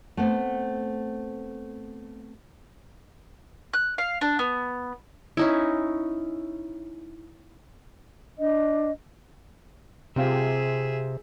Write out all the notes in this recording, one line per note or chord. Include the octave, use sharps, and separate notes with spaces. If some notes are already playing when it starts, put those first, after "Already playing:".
A3 B3 C4
F#6
F5
D4
B3
C#4 D#4 E4
D4 D#5
C3 G3 C4 F4 G#4 E5